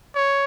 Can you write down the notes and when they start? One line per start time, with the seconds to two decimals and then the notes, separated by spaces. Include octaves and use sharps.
0.15 C#5